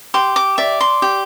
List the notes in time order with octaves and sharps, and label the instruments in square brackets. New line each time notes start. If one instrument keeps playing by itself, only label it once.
[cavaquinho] G4 C6
D6
D5 E5
C6
G4